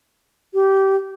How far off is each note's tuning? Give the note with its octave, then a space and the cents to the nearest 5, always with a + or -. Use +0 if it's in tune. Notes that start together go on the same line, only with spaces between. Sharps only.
G4 -20